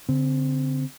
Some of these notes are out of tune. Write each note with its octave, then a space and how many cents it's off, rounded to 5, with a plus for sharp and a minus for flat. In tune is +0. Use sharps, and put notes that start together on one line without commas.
D3 -40 C4 -15